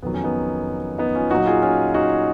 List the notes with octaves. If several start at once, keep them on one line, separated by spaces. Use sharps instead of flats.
F2 D#3 F#3 B3
C#4
B3 D#4
B3 D#4
C#4 F4
A#2 F#3 D#4 F#4
F4 G#4
C#4 F4
D#4 F#4